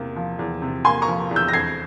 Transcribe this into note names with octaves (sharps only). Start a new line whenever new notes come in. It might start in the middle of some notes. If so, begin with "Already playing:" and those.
Already playing: E2 C3 A#3
F3
E2
C3
A#3 G#5 C6
A#5 C#6
F3
E2
E6 G6
A#6
F2 G#6 C7